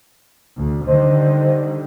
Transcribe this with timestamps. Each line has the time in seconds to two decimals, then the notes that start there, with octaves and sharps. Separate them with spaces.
0.58 D2
0.87 D3 D#3 G3 C5 D#5